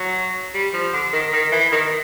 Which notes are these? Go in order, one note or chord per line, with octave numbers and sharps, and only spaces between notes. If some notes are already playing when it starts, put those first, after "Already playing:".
Already playing: F#3
G3
F3
D3
D#3
D#3
E3
D#3